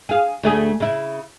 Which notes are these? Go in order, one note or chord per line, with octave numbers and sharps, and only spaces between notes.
G#4 F5
D2 A3 G#4
C#3 E4